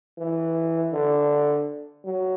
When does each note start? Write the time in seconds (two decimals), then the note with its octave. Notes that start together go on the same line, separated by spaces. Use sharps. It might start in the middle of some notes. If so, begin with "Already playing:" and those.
0.18 E3
0.93 D3
2.06 F#3